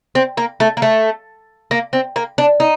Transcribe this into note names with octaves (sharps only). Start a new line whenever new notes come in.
C4
A#3
A3
A#3
A3
A#3
C4
A#3
D4
D#4